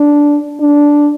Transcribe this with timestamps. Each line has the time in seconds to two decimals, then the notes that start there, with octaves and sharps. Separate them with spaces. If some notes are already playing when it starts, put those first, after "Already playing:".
Already playing: D4
0.60 D4